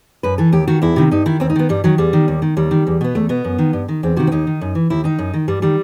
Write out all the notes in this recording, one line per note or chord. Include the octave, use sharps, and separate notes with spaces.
F#2 B4
E3 A4
D#2 G4
D#3 F#4
E2 E4
C3 D#3
G2 D#4
D#3 E4
D#2 C4
D#4
D#3 B3
G2 G3
D#3 F#3
E2 G3
D#3
D#2
D#3
D#2 G3
D#3
E2
B2 B3
E2 A3
B2 B3
F#2
D#3
G2
D#3
E2 C4
C3 D#3 F#4
C4
D#2 D#4
D#3
F#2
E3
D#2 E4
D#3 D#4
F#2
D#3
G2 G3
D#3 G3